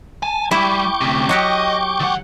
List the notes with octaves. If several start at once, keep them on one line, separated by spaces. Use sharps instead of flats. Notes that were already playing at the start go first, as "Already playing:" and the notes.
G#5 A5
G3 E4 G5 C#6 D6
D2 C3
F#3 F#4 G4 D#5
D#3 F#5